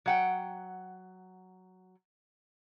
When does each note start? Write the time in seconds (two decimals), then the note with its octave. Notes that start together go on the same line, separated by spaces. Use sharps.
0.06 F#3 F#5 G5